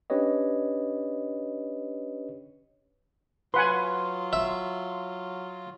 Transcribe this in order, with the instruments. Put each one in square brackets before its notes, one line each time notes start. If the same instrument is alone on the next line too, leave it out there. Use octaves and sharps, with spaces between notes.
[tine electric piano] C#4 D4 G4 B4 C#5 D#5
[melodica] F#3 F4 [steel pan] B4 F#5 G#5 [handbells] C6
[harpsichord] E5